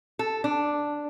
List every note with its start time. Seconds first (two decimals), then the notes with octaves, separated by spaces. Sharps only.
0.19 A4
0.44 D4